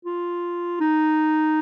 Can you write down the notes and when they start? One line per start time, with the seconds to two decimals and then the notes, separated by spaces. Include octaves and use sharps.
0.05 F4
0.81 D#4